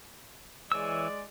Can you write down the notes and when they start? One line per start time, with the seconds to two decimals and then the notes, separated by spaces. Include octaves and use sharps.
0.72 E3 G#3 C#5 D5 E6